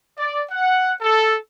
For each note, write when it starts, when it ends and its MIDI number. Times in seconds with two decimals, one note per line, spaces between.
0.17 0.42 74
0.51 0.92 78
1.01 1.35 69